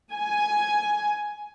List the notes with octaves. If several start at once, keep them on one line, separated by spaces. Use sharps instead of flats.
G#5